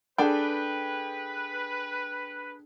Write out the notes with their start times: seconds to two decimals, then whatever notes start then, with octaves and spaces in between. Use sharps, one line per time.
0.18 D4 G#4 A4 B4 G5